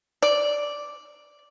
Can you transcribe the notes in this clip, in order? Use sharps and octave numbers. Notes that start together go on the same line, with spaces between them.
D5